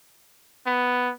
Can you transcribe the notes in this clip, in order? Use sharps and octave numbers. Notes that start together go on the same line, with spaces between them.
B3